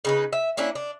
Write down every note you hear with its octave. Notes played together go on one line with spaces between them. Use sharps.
C#3 D#4 B4
E5
A#3 C#4 D4 E4
D4